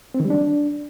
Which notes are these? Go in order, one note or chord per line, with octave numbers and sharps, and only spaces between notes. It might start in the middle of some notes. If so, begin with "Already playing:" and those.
C4
D#3
G3
D4